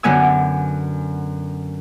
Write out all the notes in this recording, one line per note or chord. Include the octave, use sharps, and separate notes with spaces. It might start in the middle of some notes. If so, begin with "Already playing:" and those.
F#2 D3 B3 G#5 E6